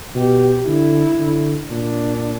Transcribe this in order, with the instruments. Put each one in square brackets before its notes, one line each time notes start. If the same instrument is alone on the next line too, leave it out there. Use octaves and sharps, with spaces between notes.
[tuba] B2 [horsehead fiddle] G4
[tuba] D3 [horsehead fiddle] E4
[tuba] D3
[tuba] A#2 [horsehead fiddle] D4